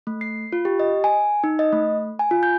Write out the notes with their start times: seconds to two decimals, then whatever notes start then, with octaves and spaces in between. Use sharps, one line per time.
0.07 A3
0.21 C7
0.52 F4
0.65 G4
0.80 D#5
1.04 G#5
1.44 D#4
1.59 D#5
1.72 A3
2.19 G#5
2.31 F4
2.43 G6